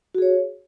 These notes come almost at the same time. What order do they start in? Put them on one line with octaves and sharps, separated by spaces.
F#4 G#4 C#5